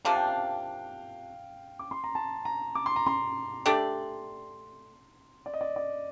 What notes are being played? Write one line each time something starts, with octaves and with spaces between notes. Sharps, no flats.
C3 F3 A#3 D4 F5
G5
F5
D6
C6
A#5
A5
A#5
D6
C6
A#5
C6
A3 D4 G4 D5
D5
D#5
D5
D5